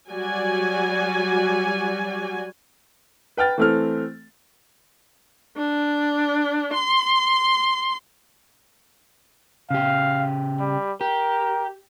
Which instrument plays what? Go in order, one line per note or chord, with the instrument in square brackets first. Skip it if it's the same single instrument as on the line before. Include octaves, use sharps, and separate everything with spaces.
[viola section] F#3 G3 F#4 D5 G#5
[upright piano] B4 G5 F6 A6
E3 A3 C4 A4 F6
[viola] D4
C6
[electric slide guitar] C#3 G4 [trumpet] F5
[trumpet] G3
[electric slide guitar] G4 [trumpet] A#4